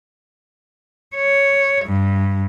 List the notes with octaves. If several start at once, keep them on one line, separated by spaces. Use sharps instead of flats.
C#5
G2